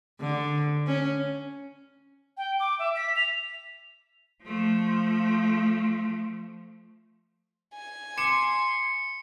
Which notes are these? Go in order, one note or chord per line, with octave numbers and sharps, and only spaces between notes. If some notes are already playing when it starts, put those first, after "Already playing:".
D3
C#4
G5
D6
E5
B6
F7
F3 A3
G#5
C6 D6 C#7 E7